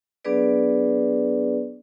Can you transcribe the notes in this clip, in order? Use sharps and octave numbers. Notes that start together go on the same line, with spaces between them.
F#3 B3 D4 G#4 B4 D5